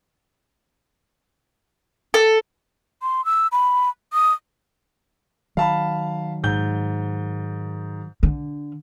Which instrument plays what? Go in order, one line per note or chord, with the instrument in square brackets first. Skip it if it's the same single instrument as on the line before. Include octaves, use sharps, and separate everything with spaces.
[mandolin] A4
[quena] C6
E6
B5
D#6
[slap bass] D#3 F#3 [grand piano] F5 A5 B5
[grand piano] G#2 G6 G7
[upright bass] D3